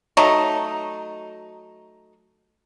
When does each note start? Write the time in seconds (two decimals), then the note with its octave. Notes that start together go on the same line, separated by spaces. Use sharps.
0.17 F#3 A3 D#4